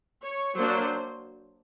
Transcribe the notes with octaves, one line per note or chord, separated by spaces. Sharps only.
C#5
F#3 A#3 D4 C5